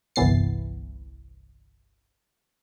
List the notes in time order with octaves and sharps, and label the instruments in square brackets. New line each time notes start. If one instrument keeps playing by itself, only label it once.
[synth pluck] G1 C2 E3 B3 A6 C7